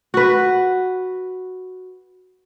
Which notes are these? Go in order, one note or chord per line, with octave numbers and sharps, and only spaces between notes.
F#4 B4